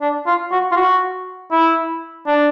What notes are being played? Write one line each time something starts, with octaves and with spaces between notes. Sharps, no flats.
D4
F4
F#4
F4
F#4
E4
D4